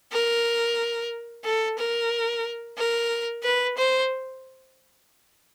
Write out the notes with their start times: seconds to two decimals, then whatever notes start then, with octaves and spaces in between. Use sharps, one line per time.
0.12 A#4
1.45 A4
1.78 A#4
2.77 A#4
3.43 B4
3.78 C5